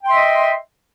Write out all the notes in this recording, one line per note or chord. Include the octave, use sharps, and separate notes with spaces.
D#5 E5 G5 C6